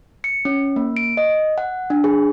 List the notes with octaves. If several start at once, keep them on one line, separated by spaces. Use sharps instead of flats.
C#7
C#4
A#3
D7
D#5
F#5
D4
G#4